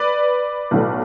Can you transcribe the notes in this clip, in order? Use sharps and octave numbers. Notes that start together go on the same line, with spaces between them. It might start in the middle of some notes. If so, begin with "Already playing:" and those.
Already playing: B4 D5
B1 A2 F#3 A3